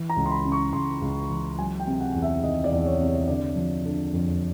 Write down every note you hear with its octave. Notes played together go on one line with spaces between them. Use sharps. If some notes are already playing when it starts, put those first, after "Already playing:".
Already playing: E3
A#5
C#2
C6
B5
C#3
C#6
C#2 C6
C#2
E3
F#3 G#5
G5
C3
F#5
E2
E5
D#3 D#5
D5
E2
C#5
C3
C#5
D3 D5
F3
D3
F2